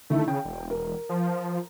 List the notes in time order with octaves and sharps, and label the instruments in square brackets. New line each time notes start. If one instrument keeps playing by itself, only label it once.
[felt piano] D3 D#3 E4 [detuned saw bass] A3
[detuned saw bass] C#3 [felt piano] G5
[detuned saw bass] E1
[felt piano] A#4
[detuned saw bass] F3